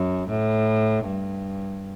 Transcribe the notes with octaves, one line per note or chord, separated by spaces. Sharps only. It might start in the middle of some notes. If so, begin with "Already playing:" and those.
Already playing: F#2
A2
G2